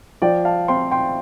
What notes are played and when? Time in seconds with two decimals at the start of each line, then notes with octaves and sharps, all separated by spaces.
0.22 F3 D5 G5
0.45 F5 A5
0.68 C4 F4 G5 C6
0.91 G5 C6